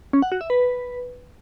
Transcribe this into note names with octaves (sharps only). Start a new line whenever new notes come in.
C#4
F#5
F#4
E5
B4